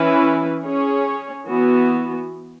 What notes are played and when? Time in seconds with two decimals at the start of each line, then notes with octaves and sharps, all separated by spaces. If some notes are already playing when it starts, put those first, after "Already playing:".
Already playing: E3 C#4 E4 B4
0.65 C#4 G#4 C#5
1.48 E3 B3 F#4